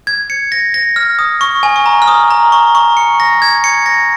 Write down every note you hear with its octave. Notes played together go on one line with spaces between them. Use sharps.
G#6
C#7
A#6
A#6
F6
D#6
C#6
G#5
C#6
A#5
F6
D#6
A#5
C#6
C#6
C#7
A#6
G#6
C#7
A#6